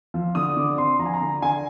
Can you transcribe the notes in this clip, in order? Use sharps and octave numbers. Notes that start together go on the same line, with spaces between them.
F3
D3 D#6
D3 D6
C4 C6
F3 A#5
G#5
A#5
D3
D3 G#5